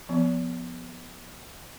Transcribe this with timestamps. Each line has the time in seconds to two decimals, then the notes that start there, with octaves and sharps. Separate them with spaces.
0.09 F3 B3